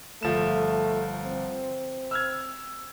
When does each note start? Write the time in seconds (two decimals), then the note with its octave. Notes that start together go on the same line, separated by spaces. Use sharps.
0.23 G1 F3 A3 E7
1.24 C4
2.11 E6 F6 G#6